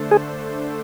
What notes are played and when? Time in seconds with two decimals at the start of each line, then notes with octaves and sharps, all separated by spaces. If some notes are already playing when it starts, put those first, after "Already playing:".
Already playing: D3 A3 D4 A4 C5
0.11 G#4